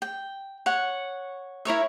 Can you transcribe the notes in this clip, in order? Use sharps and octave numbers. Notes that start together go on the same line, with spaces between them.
G5
C#5 F#5
E4 A#4 C#5 E5